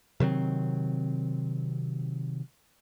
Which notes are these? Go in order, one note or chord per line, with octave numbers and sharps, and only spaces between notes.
C3 D#3 F#3 C4